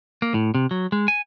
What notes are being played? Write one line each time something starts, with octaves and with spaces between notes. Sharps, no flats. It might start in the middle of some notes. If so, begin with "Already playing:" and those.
A#3
A2
C3
F#3
G#3
G#5